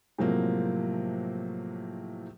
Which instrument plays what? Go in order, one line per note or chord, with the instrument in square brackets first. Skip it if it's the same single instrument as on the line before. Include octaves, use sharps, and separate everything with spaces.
[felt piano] A2 C3 F3 F#3 G#3 A#3